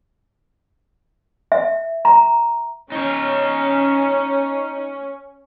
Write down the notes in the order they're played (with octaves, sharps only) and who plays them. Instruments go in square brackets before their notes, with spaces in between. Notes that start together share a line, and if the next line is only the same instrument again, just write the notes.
[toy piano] E5
A#5
[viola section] C#4 [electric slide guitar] D#4 C#5